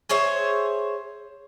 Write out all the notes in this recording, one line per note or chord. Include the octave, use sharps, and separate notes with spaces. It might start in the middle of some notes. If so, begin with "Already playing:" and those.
G#4 C5 C#5 E5